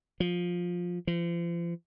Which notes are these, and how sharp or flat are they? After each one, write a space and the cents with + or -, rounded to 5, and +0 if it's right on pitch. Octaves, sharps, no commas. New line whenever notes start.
F3 +15
F3 -35